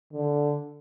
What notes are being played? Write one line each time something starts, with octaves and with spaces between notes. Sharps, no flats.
D3